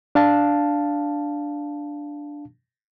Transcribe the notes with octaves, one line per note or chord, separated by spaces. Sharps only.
D4 F5 A5